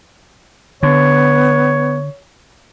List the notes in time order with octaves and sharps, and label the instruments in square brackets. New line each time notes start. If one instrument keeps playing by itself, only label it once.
[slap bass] D3 [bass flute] B3 [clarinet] C#5